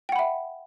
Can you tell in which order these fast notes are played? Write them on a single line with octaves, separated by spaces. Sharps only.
G5 F#5 B5 E5